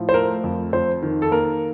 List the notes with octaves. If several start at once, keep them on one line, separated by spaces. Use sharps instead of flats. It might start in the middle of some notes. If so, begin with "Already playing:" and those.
Already playing: A2 F3
C5
A3 A#4
F2
F2 C5
D#3
A4
A#3 A#4